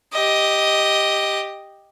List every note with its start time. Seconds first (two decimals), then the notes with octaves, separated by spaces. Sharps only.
0.13 G4 D#5